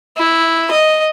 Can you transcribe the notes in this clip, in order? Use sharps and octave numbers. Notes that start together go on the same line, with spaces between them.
E4
D#5